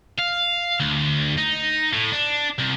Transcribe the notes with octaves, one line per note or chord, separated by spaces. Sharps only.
F5
D2
D#4
A2
D4
C2